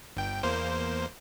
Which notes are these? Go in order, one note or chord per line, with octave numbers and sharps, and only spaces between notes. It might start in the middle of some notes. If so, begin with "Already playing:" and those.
G1 G5
E2 A#3 C5